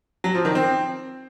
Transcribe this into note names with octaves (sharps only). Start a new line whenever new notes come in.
F#3
F3
D#3
C4